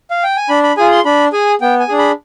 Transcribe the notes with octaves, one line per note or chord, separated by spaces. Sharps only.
F5
G5
G#5
D4 B5
B5
F4 G#4 G#5
C6
D4 B5
G#4 G#5
B3 G5
G#5
D4 G#4
B5